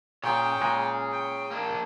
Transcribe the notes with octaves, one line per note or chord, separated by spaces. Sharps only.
A#2 G#4 C#5 G5
A#2 G#3
G5
A#3 D4